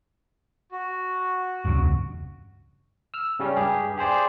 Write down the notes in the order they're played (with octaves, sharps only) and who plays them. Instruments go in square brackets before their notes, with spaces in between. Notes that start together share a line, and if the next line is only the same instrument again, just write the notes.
[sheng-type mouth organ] F#4
[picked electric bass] E1 C#2 G2
[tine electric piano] E6 F6
C#3 G3 C#4
G2 G4 G#4
G4 G#4 C5 D5